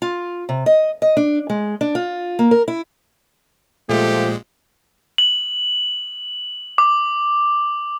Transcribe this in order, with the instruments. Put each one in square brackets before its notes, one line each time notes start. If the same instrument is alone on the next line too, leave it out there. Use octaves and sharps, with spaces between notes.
[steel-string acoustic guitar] F4
C3
D#5
D#5
D4
G#3
D4
F4
A#3
A#4
E4
[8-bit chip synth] A#2 G#3 [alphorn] F3 [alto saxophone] A3 [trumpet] G4
[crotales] F#7
D6